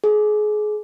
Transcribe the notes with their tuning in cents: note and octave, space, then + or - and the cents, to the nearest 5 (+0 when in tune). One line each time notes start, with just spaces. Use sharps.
G#4 +30